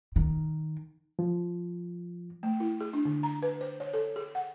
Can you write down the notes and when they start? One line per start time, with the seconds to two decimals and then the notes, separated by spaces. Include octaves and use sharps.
0.16 D#3
1.19 F3
2.43 A3
2.60 E4
2.81 G#4
2.93 D4
3.05 D3
3.23 A#5
3.43 B4
3.61 C5
3.80 C#5
3.94 A4
4.16 G#4
4.35 F#5